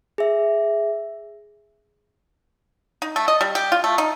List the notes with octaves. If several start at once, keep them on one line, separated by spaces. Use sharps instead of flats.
G#4 E5
D#4
A3
D#5
G3
G4
F4
A3
D#4